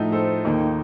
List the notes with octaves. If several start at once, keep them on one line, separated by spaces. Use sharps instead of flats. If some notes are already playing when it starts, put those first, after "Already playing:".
Already playing: A2 F3 A3 D#4
A4 C5
D#2 D#3 A#3 D#4